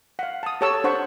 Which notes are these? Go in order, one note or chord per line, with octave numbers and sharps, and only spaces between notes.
F5 F#5
A5 D#6
G4 A4 C#5 A5 C#6 E6
D4 C5 F#5 C#6